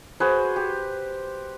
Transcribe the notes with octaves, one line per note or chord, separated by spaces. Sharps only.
F#4 G#4 B4 C5
G4